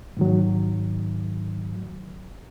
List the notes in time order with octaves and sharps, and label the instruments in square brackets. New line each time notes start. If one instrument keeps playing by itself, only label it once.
[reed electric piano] G#2 D#3 F#3